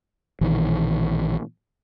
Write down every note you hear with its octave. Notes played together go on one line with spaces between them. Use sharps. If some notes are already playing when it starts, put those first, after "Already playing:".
A#1 B2 D#3 E3